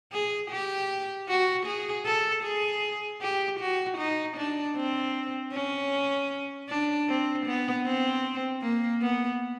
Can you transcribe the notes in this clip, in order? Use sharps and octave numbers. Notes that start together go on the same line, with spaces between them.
G#4
G4
F#4
G#4
A4
G#4
G4
F#4
D#4
D4
C4
C#4
D4
C4
B3
C4
A#3
B3